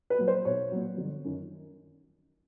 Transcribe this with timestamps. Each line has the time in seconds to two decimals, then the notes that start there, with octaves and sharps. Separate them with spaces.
0.10 B4
0.18 A#2 F#3
0.28 C5
0.45 B1 C#5
0.72 A#2 F#3
0.98 G1
1.25 F#2 D#3